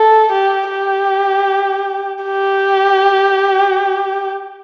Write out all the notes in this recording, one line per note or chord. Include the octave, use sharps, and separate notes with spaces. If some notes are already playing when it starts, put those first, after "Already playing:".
Already playing: A4
G4
G4
G4